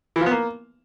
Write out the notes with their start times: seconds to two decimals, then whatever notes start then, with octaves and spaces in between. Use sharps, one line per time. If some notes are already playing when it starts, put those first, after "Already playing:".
0.16 E3
0.21 F3
0.26 B3
0.31 A#3